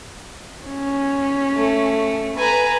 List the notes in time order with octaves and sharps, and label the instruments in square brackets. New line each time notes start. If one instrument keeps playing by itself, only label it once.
[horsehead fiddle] C#4
[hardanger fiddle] A3
[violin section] B4 [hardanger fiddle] G#5 A#5